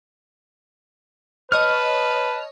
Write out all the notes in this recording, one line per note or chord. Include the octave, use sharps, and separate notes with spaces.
B4 C#5 D#5 A5 F6